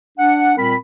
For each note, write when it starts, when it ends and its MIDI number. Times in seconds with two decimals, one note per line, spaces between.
0.18 0.52 62
0.18 0.52 78
0.57 0.75 46
0.57 0.75 55
0.57 0.75 60
0.57 0.75 70
0.57 0.75 83